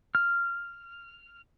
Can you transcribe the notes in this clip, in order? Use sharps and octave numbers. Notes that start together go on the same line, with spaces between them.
F6